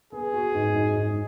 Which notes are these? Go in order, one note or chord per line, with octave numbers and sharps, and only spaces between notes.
B3 G#4
F#4
G#2
G#2
G#2